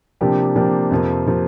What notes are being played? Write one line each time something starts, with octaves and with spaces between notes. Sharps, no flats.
C3 F3 A#3 D4 G4
C3 F3 A#3 D4 G4
F2 C3 F3 A#3
C3 F3 A#3